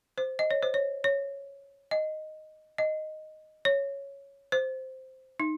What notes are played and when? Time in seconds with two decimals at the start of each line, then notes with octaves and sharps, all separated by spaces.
0.18 C5
0.39 D#5
0.51 C#5
0.62 C5
0.74 C#5
1.04 C#5
1.91 D#5
2.78 D#5
3.65 C#5
4.52 C5
5.40 D#4